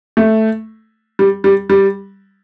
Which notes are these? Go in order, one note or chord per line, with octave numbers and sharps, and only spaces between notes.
A3
G3
G3
G3